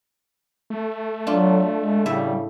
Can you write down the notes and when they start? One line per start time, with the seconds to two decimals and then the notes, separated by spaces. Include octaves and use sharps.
0.70 A3
1.27 F#3 D4 F4
1.81 G#3
2.06 A2 C#3 G3 E5